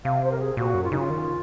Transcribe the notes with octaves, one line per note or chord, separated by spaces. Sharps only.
C3 F5
C5
A#4
G#4
A#2 F#4
F#2
F4
C#3 D#4
F4
D#3